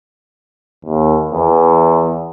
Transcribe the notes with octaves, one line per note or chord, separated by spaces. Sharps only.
D#2
E2